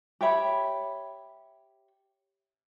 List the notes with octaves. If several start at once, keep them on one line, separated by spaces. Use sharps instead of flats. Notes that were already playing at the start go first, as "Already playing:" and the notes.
G4 C#5 E5 B5